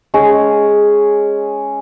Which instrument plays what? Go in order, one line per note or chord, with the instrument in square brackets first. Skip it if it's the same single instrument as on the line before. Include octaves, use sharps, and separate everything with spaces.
[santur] G#3 C#4 G#4